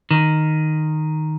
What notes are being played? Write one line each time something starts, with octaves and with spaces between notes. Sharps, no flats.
D#3